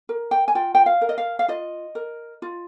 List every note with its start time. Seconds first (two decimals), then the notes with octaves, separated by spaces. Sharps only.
0.09 A#4
0.31 G5
0.48 G#5
0.55 F4 G5
0.75 G5
0.86 F5
1.01 A#4
1.09 D#5
1.18 F5
1.39 F5
1.48 F4 D#5
1.95 A#4
2.42 F4